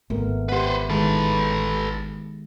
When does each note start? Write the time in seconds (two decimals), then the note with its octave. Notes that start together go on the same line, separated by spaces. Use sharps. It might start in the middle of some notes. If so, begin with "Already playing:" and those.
0.10 G#1 A3 B3 A#4
0.49 G4 B4 C5 E5 F#5
0.90 D#3 G#3 A4 B4